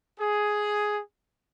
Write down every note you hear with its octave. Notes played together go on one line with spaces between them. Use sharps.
G#4